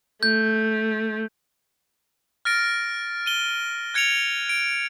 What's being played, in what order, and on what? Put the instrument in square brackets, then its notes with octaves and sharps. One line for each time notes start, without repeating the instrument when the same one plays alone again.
[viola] A3 [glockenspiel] G6
[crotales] F6 A6 A#6 D7
D#7 G7
F#6 G#6 C#7 D7 F7
D7